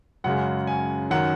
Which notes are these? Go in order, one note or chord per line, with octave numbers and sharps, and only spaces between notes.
F#2 C#3 G#3 F#5
G#5
F#2 D#3 F#3 F#5